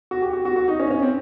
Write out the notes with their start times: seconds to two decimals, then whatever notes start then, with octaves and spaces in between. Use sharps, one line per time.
0.11 F#4
0.22 G4
0.33 F#4
0.45 F#4
0.56 F#4
0.68 D#4
0.80 C#4
0.91 C#4
1.02 C4